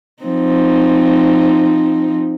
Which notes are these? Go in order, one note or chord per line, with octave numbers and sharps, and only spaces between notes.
F3 C4 D#4